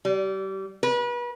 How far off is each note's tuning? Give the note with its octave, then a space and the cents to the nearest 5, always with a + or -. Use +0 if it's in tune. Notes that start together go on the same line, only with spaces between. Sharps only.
G3 -30
B4 -35